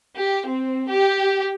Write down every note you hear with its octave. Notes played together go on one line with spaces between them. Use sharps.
G4
C4
G4